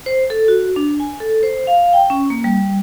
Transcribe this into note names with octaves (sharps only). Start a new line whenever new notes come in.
C5
A4
F#4
D4
G#5
A4
C5
F5
G5
C#4
A#3
G3